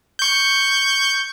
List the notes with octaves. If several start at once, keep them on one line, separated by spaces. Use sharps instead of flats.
C#6 G6